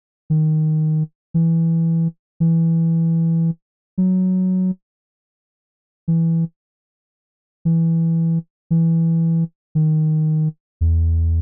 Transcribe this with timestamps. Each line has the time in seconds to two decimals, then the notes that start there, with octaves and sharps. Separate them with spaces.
0.30 D#3
1.34 E3
2.40 E3
3.98 F#3
6.08 E3
7.65 E3
8.71 E3
9.75 D#3
10.81 E2